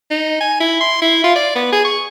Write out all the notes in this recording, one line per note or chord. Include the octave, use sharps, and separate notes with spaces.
D#4
G#5
E4
C6
E4
F4
D5
B3
G#4
C#6